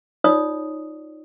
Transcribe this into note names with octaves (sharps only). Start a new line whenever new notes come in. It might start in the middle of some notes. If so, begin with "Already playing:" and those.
D#4 F4 C#5 D5 D#6